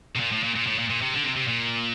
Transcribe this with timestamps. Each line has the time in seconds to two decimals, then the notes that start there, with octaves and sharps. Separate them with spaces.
0.16 C3
0.20 A#2
0.32 A2
0.44 A#2
0.56 A#2
0.67 A2
0.79 A#2
0.90 A#2
1.02 C3
1.13 D3
1.24 C3
1.36 C3
1.48 A#2